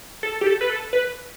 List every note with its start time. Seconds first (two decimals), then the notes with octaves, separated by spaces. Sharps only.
0.23 A4
0.41 G4
0.46 A4
0.61 B4
0.70 A4
0.93 B4